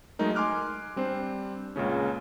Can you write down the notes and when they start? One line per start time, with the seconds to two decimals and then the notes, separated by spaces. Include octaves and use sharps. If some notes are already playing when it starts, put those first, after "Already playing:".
0.19 F#3 G#3 A3 D#4 A#4
0.35 G#5 C6 D6 F6 F#6
0.96 G3 C4 D4 C5
1.76 C#2 A#2 C#3 C#4